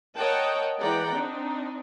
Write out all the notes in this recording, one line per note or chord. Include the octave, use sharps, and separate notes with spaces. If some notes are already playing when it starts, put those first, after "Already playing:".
A#4 C#5 D#5 F#5 G5 A5
E3 G#3 D5 F#5 G5 A#5
C4 D4 D#4